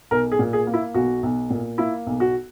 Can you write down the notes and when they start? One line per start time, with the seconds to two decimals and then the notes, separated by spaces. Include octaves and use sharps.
0.11 B1 A#4
0.31 G#4
0.39 A#2
0.53 G#4
0.67 A#3
0.74 E4
0.94 B1 F#4
1.23 B1
1.50 A#2
1.78 A#3 E4
2.07 B1
2.20 F#4